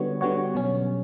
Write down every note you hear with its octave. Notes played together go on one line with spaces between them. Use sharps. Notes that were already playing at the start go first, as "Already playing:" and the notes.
Already playing: D3 G3 B3 F#4 C#5
D3 G3 B3 F#4 C#5
B2 F#3 C#4